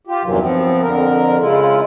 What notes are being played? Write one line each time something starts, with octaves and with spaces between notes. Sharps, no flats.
F4 G4
E2 G2 C3 D#3 E3 F#3
F3 B3 C4
F2 D3 A#4
C#3 G#3 E4 F4